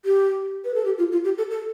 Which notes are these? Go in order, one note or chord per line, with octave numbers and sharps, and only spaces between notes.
G4
B4
A4
G4
F4
F4
G4
A4
A4